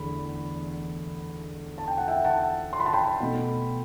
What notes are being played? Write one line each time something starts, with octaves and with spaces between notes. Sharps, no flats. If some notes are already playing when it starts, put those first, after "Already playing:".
Already playing: E2 D3 A3 B5
A5
G5
F#5
E5 G5
F#5 A5
C6
B5
A5
G5 B5
B2 A3